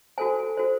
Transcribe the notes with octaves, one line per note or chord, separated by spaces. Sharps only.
F#4 A4 C5 G#5
F#4 A4 C5